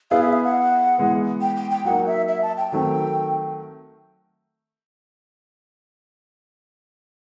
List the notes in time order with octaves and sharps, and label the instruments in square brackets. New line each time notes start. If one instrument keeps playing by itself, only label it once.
[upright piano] B3 E4 G#4 [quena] F5
[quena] E5
F5
F#5
[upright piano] E3 G#3 B3
[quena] G5
G5
G5
[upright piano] F#3 A#3 D#4 [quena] F#5
[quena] E5
E5
A5
G5
[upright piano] D#3 F#3 A3 C4 [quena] G5